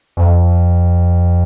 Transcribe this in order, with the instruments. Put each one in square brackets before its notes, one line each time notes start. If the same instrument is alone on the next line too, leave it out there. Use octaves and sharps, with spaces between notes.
[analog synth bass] F2